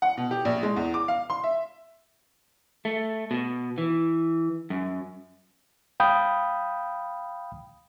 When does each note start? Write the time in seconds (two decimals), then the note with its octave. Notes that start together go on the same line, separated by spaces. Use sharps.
0.02 F#5
0.17 B2
0.31 G4
0.45 A#1
0.63 G#3
0.76 E2
0.94 D6
1.08 F5
1.30 C6
1.44 E5
2.85 A3
3.31 B2
3.78 E3
4.70 F#2
6.00 F5 G5 B5 D#6 G6